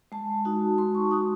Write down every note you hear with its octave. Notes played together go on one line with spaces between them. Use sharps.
G#3 A5
D#4 F#4
G#3 C6
C#6
D#4 F#4 D#6